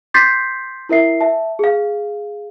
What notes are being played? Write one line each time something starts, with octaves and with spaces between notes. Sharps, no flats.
C6 D6 G6 A6 B6 C7
E4 A#4 E5 C7
E5 A5
G#4 F5